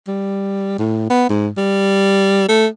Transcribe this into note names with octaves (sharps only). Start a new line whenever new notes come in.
G3
A2
B3
G#2
G3
A3